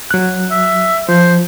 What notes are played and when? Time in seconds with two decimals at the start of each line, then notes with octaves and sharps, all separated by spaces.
0.11 F#3 F#6
0.51 E5
1.09 F3 C5